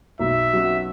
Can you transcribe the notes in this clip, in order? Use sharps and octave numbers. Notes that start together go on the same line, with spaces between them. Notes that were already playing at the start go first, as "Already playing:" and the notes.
B1 E5
B2 F#3 C#4 F#4